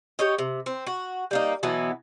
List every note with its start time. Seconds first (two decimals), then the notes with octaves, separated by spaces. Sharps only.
0.19 G4 C#5 D#5
0.38 C3
0.66 C4
0.87 F#4
1.31 G3 A#3 D#4
1.63 B2 E3 F#3 B3